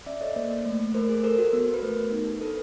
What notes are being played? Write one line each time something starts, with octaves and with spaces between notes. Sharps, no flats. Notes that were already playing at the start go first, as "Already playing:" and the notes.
C#4 D5 E5
A4 C#5 D#5
A#3 C5 D5
A#3
A3
A3
A3 A#4 C5
G#4
A4 A#4 C5
F#4
B3
B3
B4
A3 A#4 C5
A3
D#4
G4
D4 A4 B4